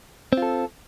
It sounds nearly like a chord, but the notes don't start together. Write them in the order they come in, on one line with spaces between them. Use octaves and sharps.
C4 F4 A4